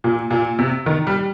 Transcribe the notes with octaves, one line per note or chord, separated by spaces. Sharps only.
A#2
A#2
C3
D#3
G3